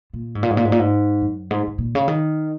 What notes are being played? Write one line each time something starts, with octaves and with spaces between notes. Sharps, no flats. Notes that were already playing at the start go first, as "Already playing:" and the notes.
A#2
G#2
A#2
G#2
A#2
G#2
A#2
G#2
F#2
G#2
G#2
A#2
C#3
D#3